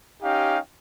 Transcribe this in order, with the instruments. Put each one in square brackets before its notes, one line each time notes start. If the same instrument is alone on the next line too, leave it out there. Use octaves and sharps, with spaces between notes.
[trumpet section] C#4 D#4 G4 F5 G5